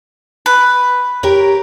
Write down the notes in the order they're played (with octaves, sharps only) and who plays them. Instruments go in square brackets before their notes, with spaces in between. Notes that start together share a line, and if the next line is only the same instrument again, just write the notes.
[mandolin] B4
[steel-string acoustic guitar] G4 A#4 C#5